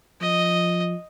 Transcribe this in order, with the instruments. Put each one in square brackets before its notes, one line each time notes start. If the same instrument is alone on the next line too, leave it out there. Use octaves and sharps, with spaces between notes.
[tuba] F3 [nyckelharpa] D#5